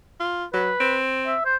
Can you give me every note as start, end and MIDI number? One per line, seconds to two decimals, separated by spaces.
0.20 0.45 65
0.54 0.70 54
0.54 0.99 71
0.80 1.35 60
1.27 1.42 76
1.45 1.56 72